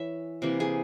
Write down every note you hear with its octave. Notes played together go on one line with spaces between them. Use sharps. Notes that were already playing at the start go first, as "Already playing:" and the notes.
Already playing: E3 C#5 E5
C3 E3 A#3
G#4